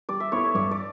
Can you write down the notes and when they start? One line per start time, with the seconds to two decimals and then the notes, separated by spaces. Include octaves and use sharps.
0.09 G3 D5
0.20 E5
0.32 B3 E4 A4 C#5
0.44 C#5
0.55 G2 D5
0.71 D5